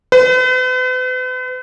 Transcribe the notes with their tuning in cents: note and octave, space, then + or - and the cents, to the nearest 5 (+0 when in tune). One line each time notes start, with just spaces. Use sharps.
B4 +45